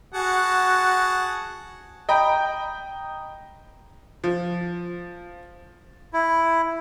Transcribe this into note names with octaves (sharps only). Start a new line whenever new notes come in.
F#4 G#4 F#5 A5
D#5 G5 A#5 B5
F3
E4